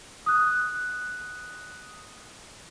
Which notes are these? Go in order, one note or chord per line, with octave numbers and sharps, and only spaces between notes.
D#6 F#6